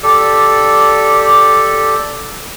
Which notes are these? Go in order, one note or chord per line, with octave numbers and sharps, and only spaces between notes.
G4 A4 D5